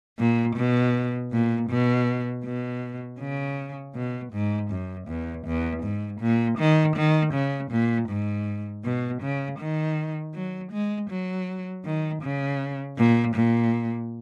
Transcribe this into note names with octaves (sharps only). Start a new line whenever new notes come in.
A#2
B2
A#2
B2
B2
C#3
B2
G#2
F#2
E2
E2
G#2
A#2
D#3
D#3
C#3
A#2
G#2
B2
C#3
D#3
F#3
G#3
F#3
D#3
C#3
A#2
A#2